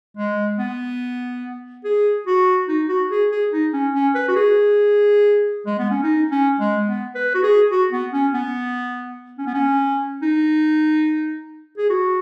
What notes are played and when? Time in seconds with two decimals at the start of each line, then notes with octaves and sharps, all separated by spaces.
0.17 G#3
0.59 B3
1.85 G#4
2.27 F#4
2.68 D#4
2.89 F#4
3.10 G#4
3.32 G#4
3.52 D#4
3.73 C#4
3.94 C#4
4.15 B4
4.29 F#4
4.36 G#4
5.66 G#3
5.79 B3
5.91 C#4
6.03 D#4
6.32 C#4
6.60 G#3
6.87 B3
7.15 B4
7.35 F#4
7.43 G#4
7.71 F#4
7.92 B3
8.13 C#4
8.34 B3
9.38 C#4
9.46 B3
9.54 C#4
10.22 D#4
11.78 G#4
11.90 F#4